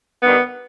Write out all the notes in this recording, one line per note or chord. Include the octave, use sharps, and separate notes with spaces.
G2 D#3 G3 B3